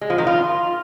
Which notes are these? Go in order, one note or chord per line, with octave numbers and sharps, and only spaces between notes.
G#3
F3
D#3
F4